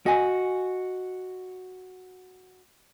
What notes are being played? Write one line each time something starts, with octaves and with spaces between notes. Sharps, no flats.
F#4 D#5 G#5